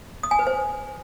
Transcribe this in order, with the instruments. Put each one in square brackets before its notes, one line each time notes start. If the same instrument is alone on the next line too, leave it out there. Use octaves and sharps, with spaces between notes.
[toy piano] D#6
G#5
B4
C5